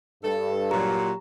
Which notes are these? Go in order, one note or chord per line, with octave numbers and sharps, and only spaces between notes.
G2 A4
A#2 F#3 G4 A#5